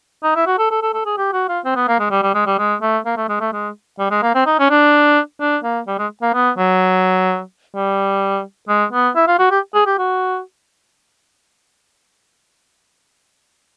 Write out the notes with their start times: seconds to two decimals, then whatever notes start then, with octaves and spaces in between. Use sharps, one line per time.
0.23 D#4
0.36 E4
0.47 F#4
0.59 A4
0.71 A4
0.83 A4
0.94 A4
1.06 G#4
1.18 G4
1.33 F#4
1.48 F4
1.65 C4
1.76 B3
1.88 A#3
2.00 G#3
2.11 G3
2.23 G3
2.35 G#3
2.46 G3
2.59 G#3
2.82 A3
3.06 A#3
3.17 A3
3.29 G#3
3.40 A3
3.53 G#3
3.99 G3
4.11 G#3
4.23 A#3
4.35 C4
4.46 D#4
4.59 C#4
4.70 D4
5.41 D4
5.63 A#3
5.87 G3
5.99 G#3
6.22 A#3
6.34 B3
6.58 F#3
7.75 G3
8.68 G#3
8.93 B3
9.16 E4
9.27 F4
9.39 F#4
9.51 G4
9.74 G#4
9.86 G4
9.98 F#4